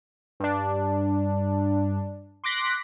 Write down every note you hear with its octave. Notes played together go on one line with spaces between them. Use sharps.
G2 D4
C6 D6 F#6 A#6 B6